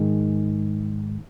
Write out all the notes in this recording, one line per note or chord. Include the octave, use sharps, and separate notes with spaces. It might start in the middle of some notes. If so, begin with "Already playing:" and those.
Already playing: G#2 D#3 G#3